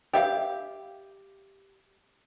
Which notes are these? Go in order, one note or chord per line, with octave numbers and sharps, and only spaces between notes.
G4 E5 F5